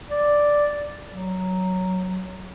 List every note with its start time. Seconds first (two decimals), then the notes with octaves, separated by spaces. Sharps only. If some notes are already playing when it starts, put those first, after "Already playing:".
0.11 D5
1.10 F#3